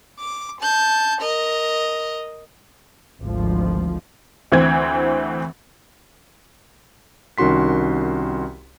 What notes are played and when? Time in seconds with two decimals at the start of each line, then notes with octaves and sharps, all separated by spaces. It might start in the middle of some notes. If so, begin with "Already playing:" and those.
0.20 D6
0.61 A5 G6
1.22 A#4 D#5
3.21 G#1 D2 G#2 F3
4.52 D2 E3 C4 G#6
7.38 C2 D#3 C#4 F#4 C6 B6